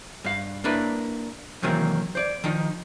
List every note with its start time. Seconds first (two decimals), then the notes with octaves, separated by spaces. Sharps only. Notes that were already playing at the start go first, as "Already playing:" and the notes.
0.24 G2 F5
0.64 A#3 D4 E4 B4
1.62 C3 D#3 E3 F#3 A#3 C4
2.15 C5 D5
2.44 D#3 F3 D#4